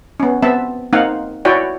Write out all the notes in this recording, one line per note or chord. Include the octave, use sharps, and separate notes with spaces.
B3 C#4
B3 C4 E5 A5
A#3 C4 D#4 F5 F#5
E4 F#4 C#5 D5 G5